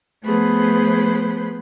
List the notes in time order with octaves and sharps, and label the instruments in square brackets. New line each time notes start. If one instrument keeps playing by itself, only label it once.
[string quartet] F3 A3 B3 G#4 B4 C5